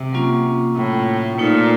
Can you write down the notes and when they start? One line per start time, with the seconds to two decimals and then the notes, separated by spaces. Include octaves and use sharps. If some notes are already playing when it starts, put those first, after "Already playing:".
Already playing: C3
0.13 F#3 A#3 C#4 F4
0.76 A2
1.38 A#2 A3 D#4 A4 C5